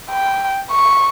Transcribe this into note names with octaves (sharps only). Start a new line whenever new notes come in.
G5
C#6